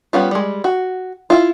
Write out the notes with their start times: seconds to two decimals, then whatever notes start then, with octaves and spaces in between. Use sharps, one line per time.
0.13 G3 B3 C#4 F4
0.31 G3 G#3
0.64 F#4
1.30 E4 F4